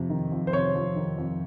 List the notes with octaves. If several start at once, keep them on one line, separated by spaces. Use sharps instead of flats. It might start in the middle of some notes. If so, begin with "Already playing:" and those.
Already playing: F2 C3
D#3
F2
C5
C3 C#5
F2
D#3
F2